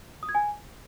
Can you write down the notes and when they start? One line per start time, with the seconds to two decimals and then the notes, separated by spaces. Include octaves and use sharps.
0.23 D#6
0.29 G#6
0.35 G#5